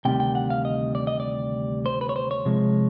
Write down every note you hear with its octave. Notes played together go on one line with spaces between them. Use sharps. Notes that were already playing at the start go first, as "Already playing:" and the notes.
D2 C3 D#3 G3 G5
G5
F#5
F5
D#5
D5
D#5
D5
C5
B4
C#5
C5
C#5
C3 F3 G#3